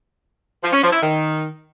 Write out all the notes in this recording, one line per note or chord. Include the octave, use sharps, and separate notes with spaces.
F3
C#4
F3
E4
D#3